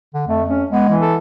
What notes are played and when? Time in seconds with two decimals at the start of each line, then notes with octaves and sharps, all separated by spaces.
0.14 D3
0.27 F2 A3
0.48 C#4
0.71 G#3 B3
0.89 E3
1.02 A4